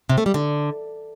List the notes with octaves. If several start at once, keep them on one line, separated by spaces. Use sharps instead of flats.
C3
A3
G3
D3